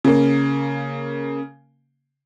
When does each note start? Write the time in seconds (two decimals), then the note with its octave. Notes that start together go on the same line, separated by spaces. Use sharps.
0.04 C#3 A#3